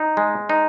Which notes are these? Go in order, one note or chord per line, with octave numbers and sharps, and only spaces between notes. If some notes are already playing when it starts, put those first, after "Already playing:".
Already playing: D#4
G#3
D#4